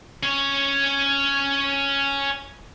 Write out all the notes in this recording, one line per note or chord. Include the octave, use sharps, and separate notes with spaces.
C#4 C#5